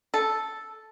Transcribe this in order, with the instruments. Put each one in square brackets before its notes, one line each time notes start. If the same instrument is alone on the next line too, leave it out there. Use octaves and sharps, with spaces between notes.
[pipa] A4